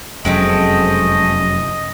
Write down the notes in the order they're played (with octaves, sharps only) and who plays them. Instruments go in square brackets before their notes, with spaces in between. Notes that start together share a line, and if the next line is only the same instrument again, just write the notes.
[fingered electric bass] F1 F#2 [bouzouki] G#3 A3 C4 [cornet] D#5